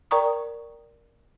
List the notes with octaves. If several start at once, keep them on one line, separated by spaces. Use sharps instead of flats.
A#4 D5 G5 A#5 C#6 D#6